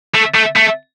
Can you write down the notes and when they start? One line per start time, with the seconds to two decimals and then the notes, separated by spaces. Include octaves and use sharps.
0.14 A3
0.35 A3
0.56 A3